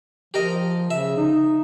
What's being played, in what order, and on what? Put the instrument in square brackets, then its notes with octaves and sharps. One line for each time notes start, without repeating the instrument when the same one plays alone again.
[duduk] F3 [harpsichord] G4 A#4 D#5
[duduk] C#3 [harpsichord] E5
[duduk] D#4